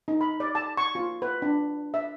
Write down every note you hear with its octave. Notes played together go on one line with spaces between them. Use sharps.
D#4
B5
D5
A5
C#6
F4
B4
D4
E5